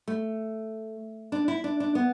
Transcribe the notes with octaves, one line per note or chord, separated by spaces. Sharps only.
A3
D4
E4
D4
D4
B3